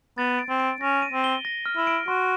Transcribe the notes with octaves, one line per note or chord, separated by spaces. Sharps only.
B3 A6
D7
C4
D7
C#4 A#6
D#7
C4
G7
A#6
F6
E4
D7
F#4 C6